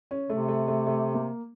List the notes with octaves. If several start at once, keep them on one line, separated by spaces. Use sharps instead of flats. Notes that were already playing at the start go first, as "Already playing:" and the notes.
C#4
C3 A3
A3
A3
A3
A#3